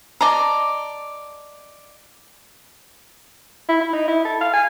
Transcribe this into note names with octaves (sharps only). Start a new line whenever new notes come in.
D5 D#5 A5 A#5
E4
E4
D#4
E4
A4
F5
G#5